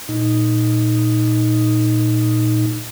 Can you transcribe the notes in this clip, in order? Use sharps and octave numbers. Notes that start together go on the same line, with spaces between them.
A#2 D#4